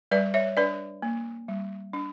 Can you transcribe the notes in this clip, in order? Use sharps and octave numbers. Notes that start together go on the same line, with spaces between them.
G3 B4 D5
C#5 E5
D4 B4 D5
A#3
G3
D4